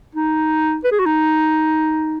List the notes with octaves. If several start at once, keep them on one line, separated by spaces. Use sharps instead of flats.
D#4
B4
G#4
F#4
D#4